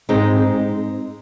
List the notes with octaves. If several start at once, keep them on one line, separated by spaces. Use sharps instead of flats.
G#2 G#3 C4 D#4